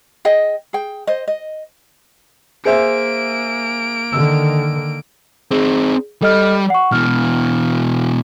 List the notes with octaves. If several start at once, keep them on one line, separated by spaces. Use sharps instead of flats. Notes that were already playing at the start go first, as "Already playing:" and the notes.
G#4 D#5 G5
G#4 G5
C5 D#5
D#5
A#3 G#4 C5 E5 D7
D3 D#3 E6
C4 D#4 G#4
G3 A4 D#5 F6
F#5 C#6
B2 E3 F6